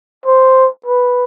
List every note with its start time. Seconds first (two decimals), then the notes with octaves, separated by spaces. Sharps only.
0.26 C5
0.86 B4